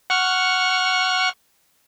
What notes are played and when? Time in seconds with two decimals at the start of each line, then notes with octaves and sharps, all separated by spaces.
0.10 F#5 C#6 F6